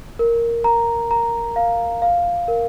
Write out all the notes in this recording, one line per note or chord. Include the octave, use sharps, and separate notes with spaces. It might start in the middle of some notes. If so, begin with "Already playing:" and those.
A#4
A#5
A#5
F5
F5
A#4